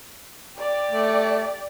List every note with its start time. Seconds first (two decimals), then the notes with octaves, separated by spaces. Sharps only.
0.59 G4 D5
0.91 A3